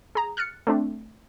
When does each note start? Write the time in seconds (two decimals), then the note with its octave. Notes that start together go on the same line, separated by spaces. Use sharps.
0.15 G#4 A#5
0.37 F6 F#6 A6 C#7
0.67 A3 C4 D4